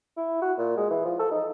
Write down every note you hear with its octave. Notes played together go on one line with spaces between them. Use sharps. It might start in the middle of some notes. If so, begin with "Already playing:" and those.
E4
F#4
A#2
G#3
E3
F3
A4
D#4